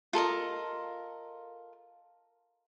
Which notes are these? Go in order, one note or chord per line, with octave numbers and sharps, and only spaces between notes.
F4 A4 A#4 D#5